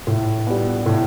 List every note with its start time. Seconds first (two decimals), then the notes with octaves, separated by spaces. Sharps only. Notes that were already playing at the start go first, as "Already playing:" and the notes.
0.07 A2
0.47 G3 B3
0.86 A2